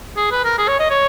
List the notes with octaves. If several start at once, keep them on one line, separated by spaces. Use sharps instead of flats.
G#4
B4
A#4
G#4
C#5
D#5
C#5